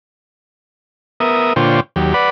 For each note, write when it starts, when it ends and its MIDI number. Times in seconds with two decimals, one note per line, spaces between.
1.20 1.53 59
1.20 1.53 70
1.20 1.53 76
1.20 1.53 87
1.56 1.80 46
1.56 1.80 50
1.56 1.80 65
1.56 1.80 72
1.56 1.80 73
1.56 1.80 79
1.96 2.14 39
1.96 2.14 54
1.96 2.14 67
2.14 2.30 71
2.14 2.30 74
2.14 2.30 78
2.14 2.30 83